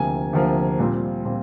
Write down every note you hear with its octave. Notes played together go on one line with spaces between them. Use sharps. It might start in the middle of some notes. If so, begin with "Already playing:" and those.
Already playing: D2 C3 F3 A#3 G#5
D2 C3 F3 A#3
A#2 G3 C4 F4
A#2 G3 C4 F4